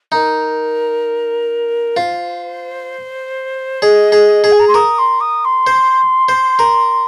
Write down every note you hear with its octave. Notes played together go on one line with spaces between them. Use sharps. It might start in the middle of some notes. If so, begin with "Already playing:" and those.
D#4 A#4
F4 C5
G#4 D#5
G#4
G#4
G#5
A#5
C6
A#4 D#6
C6
D#6
C6
C5
C5
A#4